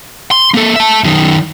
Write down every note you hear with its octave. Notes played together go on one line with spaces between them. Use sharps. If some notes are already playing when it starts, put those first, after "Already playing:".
C6
A#3 A4
E5 A5
F#2 D#3